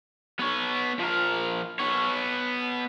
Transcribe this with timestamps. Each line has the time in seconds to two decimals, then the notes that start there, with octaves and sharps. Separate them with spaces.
0.39 B3 C#5
0.99 F3 A#4
1.79 B3 C#5